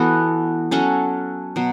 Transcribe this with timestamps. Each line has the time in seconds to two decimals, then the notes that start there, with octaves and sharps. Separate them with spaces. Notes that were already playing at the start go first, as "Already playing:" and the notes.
Already playing: E3 B3 F#4 A4
0.71 F#3 C#4 F#4 A4
1.56 B2 F#3